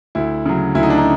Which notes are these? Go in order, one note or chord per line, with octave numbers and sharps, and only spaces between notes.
D2 E4
C#3 F#3
D2 E4
D#4
D4
D#4